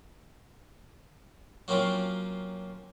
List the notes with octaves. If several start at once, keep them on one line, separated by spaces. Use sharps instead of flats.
F#3 A#3 C4 C#4 F4